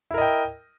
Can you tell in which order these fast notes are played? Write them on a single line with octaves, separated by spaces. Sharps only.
E4 A#4 D#5 G5